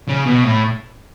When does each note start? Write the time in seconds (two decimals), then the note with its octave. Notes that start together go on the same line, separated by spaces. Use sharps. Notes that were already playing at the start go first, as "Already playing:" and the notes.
0.08 C#3
0.26 B2
0.44 A2